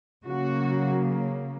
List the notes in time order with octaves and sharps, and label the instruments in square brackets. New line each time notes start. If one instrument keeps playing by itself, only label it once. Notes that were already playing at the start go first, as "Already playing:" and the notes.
[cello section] C#3 F#3 A#3 F#4